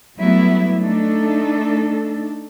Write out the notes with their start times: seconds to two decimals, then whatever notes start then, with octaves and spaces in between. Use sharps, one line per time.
0.17 F#3 G3 A3 B3 E4
0.81 A3 D4 D#4 A4